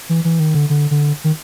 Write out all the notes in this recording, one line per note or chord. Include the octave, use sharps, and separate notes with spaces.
E3
E3
D#3
D3
D3
D3
D#3